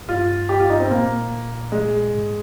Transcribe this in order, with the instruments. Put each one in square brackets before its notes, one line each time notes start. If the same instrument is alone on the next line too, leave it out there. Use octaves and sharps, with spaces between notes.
[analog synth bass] G2 [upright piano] F4
[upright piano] G4
F4
D#4
C4
[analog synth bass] A#2 [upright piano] A#3
[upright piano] G#3
[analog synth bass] G#2